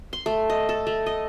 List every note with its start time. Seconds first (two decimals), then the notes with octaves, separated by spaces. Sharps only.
0.13 C6
0.26 A3
0.50 D#5
0.69 A4
0.87 A3
1.06 D#5